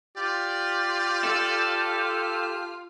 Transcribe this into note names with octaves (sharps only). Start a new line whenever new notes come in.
F4 G4 D5
A4